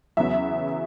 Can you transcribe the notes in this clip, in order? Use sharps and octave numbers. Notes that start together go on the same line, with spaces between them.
E2 C#3 F#3 B3 E5